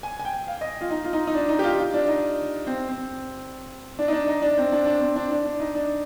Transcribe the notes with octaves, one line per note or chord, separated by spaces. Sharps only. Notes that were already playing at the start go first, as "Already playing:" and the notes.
G#5
G#5
G5
F5
D#5
F4
D#4
F4
D#4
D#4
D4
D#4
G4
F4
F4
D4
D#4
C4
C4
D4
D#4
D4
D#4
D4
C4
D4
D4
C4
D4
D4
D4
D#4
D4